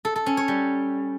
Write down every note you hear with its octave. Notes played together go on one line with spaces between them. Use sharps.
A4
A4
C#4
C#5
G3